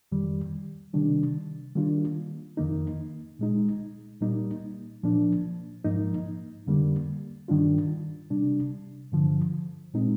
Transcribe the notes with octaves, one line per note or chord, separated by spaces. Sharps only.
F2 D#3 G3
C3 D#3 G3 D4
D#3 G3 A#3 D4 F4
F2 D#3 A#3 D#4
A#2 G#3 D#4
A#2 G3 A#3 D#4
A#2 F3 A#3 D4
G#2 F3 A#3 D#4
F2 D3 G3 A#3
G2 D#3 G3 D4 F4
C3 G3 D4
G2 D3 F3
A#2 G#3 C4 D#4